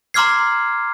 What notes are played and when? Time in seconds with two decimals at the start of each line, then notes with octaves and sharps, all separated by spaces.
0.14 A#5 C6 D6 F6 G#6 C7